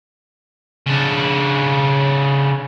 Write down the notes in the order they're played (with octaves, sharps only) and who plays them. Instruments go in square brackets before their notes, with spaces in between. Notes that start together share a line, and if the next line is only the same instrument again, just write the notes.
[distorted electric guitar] C#3 D4